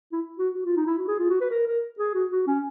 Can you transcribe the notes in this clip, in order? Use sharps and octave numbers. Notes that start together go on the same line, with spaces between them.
E4
F#4
F#4
F4
D#4
E4
F#4
G#4
F4
F#4
B4
A#4
A#4
G#4
F#4
F#4
C#4